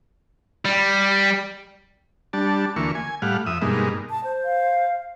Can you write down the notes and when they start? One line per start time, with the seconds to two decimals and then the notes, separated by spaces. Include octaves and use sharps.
0.65 G3
2.33 G3 D4 A5
2.76 D2 E3 A#3 C#6
2.95 G#5
3.22 A2 G3 F5 F#5
3.46 F2 E5 D#6
3.62 G2 B2 G#3 A#3 D#4
4.10 A5
4.24 C5
4.45 F5